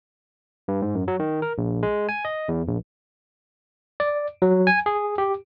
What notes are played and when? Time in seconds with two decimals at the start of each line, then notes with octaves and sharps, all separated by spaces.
0.68 G2
0.82 G#2
0.95 F#2
1.08 F#3
1.20 D#3
1.42 A#4
1.58 A#1
1.83 G#3
2.09 G#5
2.25 D#5
2.48 E2
2.68 A#1
4.00 D5
4.42 F#3
4.67 G#5
4.86 G#4
5.18 G4